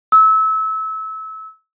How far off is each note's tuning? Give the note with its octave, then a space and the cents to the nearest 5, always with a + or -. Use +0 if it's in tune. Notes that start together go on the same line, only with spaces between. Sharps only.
E6 -25